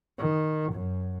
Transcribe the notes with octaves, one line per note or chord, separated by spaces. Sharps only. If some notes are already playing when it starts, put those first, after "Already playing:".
D#3
F#2